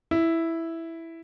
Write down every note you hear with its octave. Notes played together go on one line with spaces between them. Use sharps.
E4